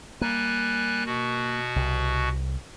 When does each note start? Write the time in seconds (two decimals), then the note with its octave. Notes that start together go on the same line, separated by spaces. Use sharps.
0.21 G3 A#3 G#5 F#6
1.06 B2 F#4
1.76 C2